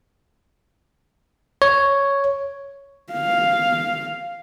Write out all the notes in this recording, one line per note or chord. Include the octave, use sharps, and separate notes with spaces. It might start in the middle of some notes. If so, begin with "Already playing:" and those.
C#5
F5